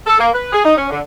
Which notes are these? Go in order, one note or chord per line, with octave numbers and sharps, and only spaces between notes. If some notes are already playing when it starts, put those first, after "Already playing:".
A4
A#3
B4
G#4
D#4
C#4
D3